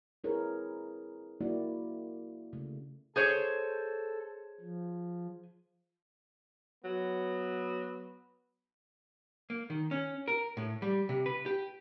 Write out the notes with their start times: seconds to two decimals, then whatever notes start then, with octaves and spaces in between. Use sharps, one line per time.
0.24 C4 E4 G#4 A#4 B4 C#5
1.41 A#3 E4 F#4 D5
2.53 C#3 A3
3.16 G#4 A4 C5 C#5
4.61 F3
6.84 F#3 B3
9.50 A#3
9.70 D#3
9.91 C#4
10.28 A#4
10.57 A2
10.82 G3
11.09 C3
11.26 B4
11.46 G4